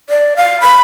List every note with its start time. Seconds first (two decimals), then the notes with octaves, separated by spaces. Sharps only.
0.10 D5
0.37 F5
0.61 B5